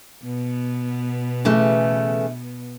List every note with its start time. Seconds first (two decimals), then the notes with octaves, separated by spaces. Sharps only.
0.24 B2 B3
1.45 C#3 E3 A3